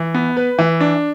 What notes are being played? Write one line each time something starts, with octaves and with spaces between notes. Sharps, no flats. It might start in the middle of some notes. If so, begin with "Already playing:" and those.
Already playing: E3
B3
B4
E3
D4